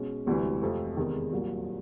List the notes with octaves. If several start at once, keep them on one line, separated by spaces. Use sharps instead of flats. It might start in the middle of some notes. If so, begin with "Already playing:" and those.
Already playing: B2 G#3 C#4
E1 D2 C3 E3 G3
F2 C3 F3 A3
E2 C3 D#3 G#3
C2 A#2 F#3 A#3